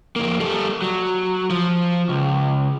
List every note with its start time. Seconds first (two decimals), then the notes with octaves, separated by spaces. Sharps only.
0.16 F2 A#3
0.40 G3 A4
0.82 F#3
1.50 F3
2.09 C#2